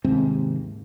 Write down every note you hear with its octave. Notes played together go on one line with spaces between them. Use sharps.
D#2 G#2 C3 C4